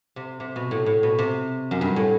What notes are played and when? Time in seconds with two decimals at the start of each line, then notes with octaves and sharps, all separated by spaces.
0.16 C3
0.40 C3
0.56 B2
0.71 A2
0.86 A2
1.03 B2
1.18 C3
1.71 F#2
1.81 G2
1.96 A2